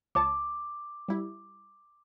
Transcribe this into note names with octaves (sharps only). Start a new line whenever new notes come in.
C#2 C#5 A5 D6
G3 E4